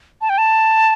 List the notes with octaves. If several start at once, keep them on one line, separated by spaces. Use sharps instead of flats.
A5
G5
A5